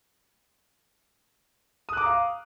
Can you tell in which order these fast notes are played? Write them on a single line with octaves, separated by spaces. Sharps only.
D#6 F#6 D6 A#5 F5